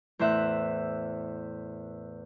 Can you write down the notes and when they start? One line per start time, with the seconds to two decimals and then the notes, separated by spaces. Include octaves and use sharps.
0.19 E2 A2 C5 E5 F#6